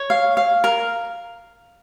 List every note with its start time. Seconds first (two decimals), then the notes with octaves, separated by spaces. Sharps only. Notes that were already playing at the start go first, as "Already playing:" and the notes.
Already playing: C#5
0.10 F5
0.37 F5
0.64 A#4